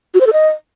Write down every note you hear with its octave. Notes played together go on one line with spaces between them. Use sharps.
F#4
C5
A4
D#5